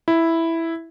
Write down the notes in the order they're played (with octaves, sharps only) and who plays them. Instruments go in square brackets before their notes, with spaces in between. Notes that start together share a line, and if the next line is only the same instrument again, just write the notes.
[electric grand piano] E4